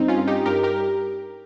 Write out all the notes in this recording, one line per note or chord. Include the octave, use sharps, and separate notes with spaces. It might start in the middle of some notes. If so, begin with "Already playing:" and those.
Already playing: G2 C4 D#4
C#4 F4
G2
D#4 G4
G2 G4 A#4
G4 A#4